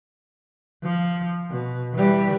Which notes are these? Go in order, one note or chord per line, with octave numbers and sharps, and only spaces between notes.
F3
B2
E3 G3